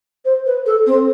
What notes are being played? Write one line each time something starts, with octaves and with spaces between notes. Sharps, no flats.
C5
B4
A4
C4